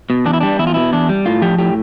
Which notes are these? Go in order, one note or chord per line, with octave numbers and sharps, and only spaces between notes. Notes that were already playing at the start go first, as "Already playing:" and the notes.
B2
E2 D4
E4
G3 D4
E2 E4
F4
B2 E4
E2 D4
G3
A2 F4
F3 G4
A2 G4